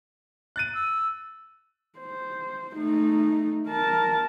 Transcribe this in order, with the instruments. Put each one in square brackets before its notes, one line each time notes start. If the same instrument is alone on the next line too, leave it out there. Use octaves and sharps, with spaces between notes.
[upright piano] F#6 A6 D#7
[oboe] E6
[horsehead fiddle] C5
A3 D#4
A#4 A5